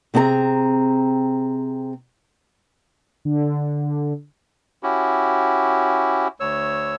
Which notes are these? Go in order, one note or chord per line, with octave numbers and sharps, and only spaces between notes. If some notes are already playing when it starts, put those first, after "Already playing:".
C3 C4 G#4 A5 A#5
D3
C#4 E4 F#4 G4
D2 C#5 E6